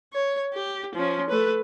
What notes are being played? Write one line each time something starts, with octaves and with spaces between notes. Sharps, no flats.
C#5
G4
F3 C#4
A3 B4